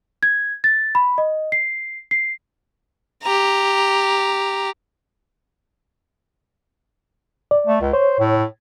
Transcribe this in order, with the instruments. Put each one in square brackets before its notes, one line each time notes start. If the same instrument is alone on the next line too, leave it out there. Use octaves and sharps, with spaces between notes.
[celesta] G#6
A6
B5
D#5
C7
C7
[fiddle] G4 A#5
[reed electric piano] D5
[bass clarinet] A3
C#2
[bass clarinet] C5 [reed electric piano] C#5
[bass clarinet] A2